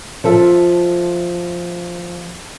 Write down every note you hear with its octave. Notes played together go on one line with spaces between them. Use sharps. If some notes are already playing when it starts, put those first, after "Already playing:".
F3 A4 E5